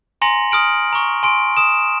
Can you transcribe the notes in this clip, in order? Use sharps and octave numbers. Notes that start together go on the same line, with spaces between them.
G#5 A#5 C6 A#6 C#7 F#7
D#6 F6 D7 F#7
A#5 C#6
G#5 C6 D7
D#6 E7